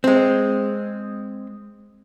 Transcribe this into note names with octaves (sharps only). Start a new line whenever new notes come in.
G#3 C4